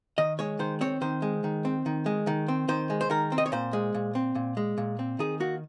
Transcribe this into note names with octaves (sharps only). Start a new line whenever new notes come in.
D#3 D#5
G#3 C#5
D#3 C5
C4 C#5
D#3 C5
G#3
D#3
C4
D#3
G#3
D#3
C4
D#3 C5
G#3
C5
D#3 A#4
C4
D#5
C#5
A#2 C5
G#3
A#2
C4
A#2
G#3
A#2
C4
D#3 G#4
A#3 F#4